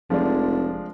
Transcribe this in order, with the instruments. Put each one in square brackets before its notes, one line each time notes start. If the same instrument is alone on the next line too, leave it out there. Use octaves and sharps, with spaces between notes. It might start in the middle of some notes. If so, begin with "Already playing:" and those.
[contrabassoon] F1 [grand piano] F3 G#3 D4